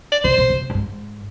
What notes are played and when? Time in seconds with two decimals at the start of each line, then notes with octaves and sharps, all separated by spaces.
0.12 D5
0.24 C3 C5
0.38 B2
0.50 C3
0.69 G2
0.74 G#2